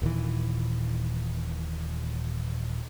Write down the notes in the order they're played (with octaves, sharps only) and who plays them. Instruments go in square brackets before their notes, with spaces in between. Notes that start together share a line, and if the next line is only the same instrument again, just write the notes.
[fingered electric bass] D#1 A#2 D#3 E3